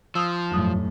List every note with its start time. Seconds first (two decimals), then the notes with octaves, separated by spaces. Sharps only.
0.15 F3 D#6 E6
0.51 G1 F2 A2 F#3 D#6